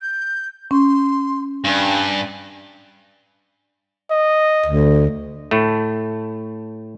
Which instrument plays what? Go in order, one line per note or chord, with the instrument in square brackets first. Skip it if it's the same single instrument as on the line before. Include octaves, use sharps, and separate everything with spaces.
[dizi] G6
[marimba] C#4 [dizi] C6
[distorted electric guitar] G2 [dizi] G#5
[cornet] D#5
[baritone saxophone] D2
[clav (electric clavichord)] A2 A3